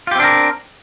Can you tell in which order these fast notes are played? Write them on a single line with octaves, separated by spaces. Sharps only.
F4 G4 C4 D4 A#4